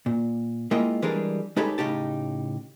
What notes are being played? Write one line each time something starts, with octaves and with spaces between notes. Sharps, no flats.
A#2
G#3 A#3 E4 F4 D#5 G5
E3 G3 G#3 D4 G#4 A#4
G#3 D#4 G4 A4 B4 C#5
A2 C#3 D#4 G4 A5